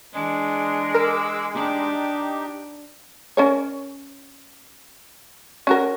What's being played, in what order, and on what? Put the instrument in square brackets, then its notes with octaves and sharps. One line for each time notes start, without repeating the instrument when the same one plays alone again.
[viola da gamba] E3 D4 [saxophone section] G#3
[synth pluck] A#4 [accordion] D6 E6
[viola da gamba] D4 [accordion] D#4 G4
[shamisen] C#4 A#4 C#5
C#4 F#4 A#4